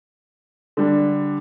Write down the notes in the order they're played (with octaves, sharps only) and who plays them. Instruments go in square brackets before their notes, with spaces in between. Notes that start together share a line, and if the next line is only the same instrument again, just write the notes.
[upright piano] D3 G3 D4